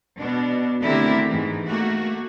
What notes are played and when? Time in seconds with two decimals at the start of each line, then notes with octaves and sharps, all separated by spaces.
0.18 B2 D4
0.84 D3 A3 C4 E4 G4 A#4
1.28 G#2 E3
1.68 A3 A#3 F#4